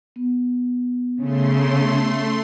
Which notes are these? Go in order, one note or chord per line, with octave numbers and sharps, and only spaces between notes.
B3
C#3 A3 C6